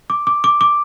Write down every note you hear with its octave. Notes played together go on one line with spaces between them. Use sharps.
D6
D6
D6
D6